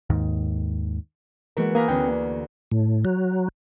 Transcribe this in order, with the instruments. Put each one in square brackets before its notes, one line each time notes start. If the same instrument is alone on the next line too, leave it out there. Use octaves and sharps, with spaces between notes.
[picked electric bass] D#2 G#2 D#3
[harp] E3 B3 F#4 [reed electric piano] G#3 A#3 A#4
[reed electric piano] A#3 [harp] G#4 A#4 B4
[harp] D2 [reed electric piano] B3 C#4 G5
[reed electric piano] A#3
[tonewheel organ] A2
F#3